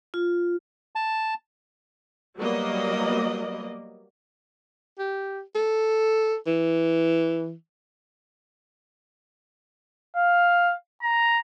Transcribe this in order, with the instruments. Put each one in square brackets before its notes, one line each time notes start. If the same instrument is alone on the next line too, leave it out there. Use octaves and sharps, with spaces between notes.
[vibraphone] F4
[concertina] A5
[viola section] F#3 G3 A#3 B3 D5 D#5
[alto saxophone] G4
A4
E3
[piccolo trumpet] F5
A#5